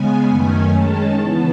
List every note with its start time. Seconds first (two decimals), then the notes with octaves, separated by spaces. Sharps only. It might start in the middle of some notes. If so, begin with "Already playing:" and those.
Already playing: C#3 G#3 B3 G#5
0.27 F#2 D#3 A3 C#4 G#5
0.73 D#3 G#3 C#4 A5
1.17 C#3 E3 B3 A5